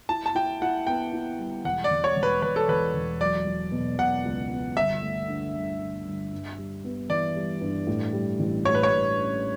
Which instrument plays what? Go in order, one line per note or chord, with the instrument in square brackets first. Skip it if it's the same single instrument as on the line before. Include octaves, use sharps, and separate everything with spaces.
[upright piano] E4 [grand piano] A5
[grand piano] A5
[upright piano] E4 [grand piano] G5
[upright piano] E4 [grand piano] F#5
[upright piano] B3 [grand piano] G5
[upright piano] E4
G3
[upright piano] E1 [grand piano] F#5
[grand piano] D5
[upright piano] E2
[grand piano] C#5
[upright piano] E1
[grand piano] B4
[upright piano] E1 [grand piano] B4
[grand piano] A4
[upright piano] E2 [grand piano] B4
[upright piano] E1
[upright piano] F#3 [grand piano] D5
[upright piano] F#3
B2
[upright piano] B2 [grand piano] F#5
[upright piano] C#2
B3
[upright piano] G1 [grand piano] E5
[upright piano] A3
D3
G1
D3
G1
G2
G3
B3
[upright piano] E3 [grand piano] D5
[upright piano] G3
G2
A2
G3
A1
[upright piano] A2 [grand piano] C#5
[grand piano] B4
C#5
[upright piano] A2
C#4